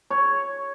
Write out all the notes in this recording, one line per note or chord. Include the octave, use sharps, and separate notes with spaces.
C#5